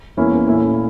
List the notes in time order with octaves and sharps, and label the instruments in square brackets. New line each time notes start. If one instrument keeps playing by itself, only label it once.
[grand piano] E2 E3 A#3 C#4 E4
A#2 A3 C#4 E4